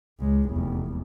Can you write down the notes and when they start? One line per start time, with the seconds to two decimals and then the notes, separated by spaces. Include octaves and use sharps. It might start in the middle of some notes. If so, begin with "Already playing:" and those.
0.20 C#2 G#3
0.50 F1 E2